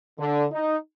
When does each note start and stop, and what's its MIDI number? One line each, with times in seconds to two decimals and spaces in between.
0.19 0.46 50
0.52 0.77 63